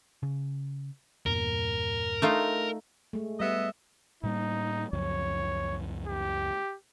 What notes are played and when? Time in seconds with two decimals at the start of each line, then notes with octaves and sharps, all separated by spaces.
0.23 C#3
1.26 E2 G2 A#2 A#4
2.22 A3 D4 D#4 F4
3.13 G#3 A3
3.40 G3 B3 D#5 E5
4.23 A2 G3 A#3 D#4
4.93 C#2 F#2 F3 C#5
6.08 G4